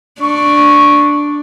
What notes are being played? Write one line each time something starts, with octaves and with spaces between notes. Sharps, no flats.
D4 C#6